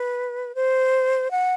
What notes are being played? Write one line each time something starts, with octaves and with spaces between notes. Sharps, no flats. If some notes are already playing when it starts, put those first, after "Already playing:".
Already playing: B4
C5
F#5